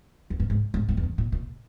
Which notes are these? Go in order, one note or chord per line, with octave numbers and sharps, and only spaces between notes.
E2
G2
G#2
G#2
G#2
E2
G2
A#2
A#2